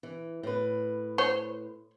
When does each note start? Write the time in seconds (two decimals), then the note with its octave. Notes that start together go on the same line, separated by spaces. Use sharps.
0.03 E3
0.43 A2 B4
1.18 C5 C#5